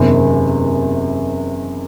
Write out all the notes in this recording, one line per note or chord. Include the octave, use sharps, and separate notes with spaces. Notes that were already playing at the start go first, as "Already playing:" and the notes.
Already playing: F#1 E2 C3 D#3